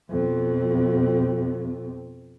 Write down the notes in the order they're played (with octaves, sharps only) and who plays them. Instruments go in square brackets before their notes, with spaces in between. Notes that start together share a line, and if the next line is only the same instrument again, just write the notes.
[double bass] F2 B2